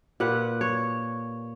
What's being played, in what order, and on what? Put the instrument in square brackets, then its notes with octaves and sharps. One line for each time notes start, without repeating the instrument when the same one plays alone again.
[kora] A#2 G4 B4 F#5
C#5